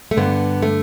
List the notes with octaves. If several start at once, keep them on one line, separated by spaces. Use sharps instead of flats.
A3
G2 D3 B3
A3